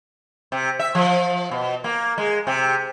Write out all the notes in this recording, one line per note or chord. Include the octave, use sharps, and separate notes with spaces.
C3
E5
F3
B2
A#3
G#3
C3